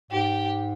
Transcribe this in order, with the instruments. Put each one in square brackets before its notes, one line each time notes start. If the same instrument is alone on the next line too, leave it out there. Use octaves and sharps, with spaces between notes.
[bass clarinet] G#2 [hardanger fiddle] G4